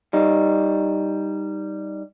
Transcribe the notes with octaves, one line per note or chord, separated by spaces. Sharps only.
G3 D#4